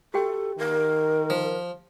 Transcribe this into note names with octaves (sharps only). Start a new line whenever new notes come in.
F#4 G4 A4 G5
D#3 A#4
F3